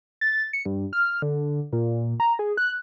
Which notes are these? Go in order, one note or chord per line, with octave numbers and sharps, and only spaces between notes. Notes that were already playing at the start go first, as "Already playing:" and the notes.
A6
C#7
G2
F6
D3
A#2
A#5
G#4
F#6